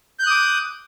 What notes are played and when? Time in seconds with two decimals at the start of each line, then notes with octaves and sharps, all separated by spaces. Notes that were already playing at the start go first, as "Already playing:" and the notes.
0.19 G6
0.23 F#6
0.27 D#6
0.30 D6